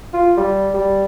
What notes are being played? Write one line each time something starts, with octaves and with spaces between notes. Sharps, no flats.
F4
G3
G3